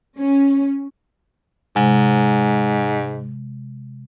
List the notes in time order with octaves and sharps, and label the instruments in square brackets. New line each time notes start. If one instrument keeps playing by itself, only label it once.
[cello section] C#4
[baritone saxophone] G#2 [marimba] C3 G#3